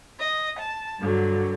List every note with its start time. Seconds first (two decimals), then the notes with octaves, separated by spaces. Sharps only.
0.19 D#5
0.60 A5
0.99 G2 D3 F#3